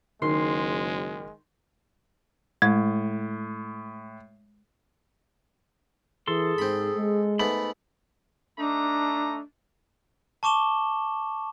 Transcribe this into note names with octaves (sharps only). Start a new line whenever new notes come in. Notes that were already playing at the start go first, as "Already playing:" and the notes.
F#1 D#3 G#3 C6
A2 G#3
E3 G#4 A4 C6
G#2 C4 B5
G#3
G#2 A3 B3 B5
A3 D4 D#4 A#5
A5 C#6 D6 E7 G7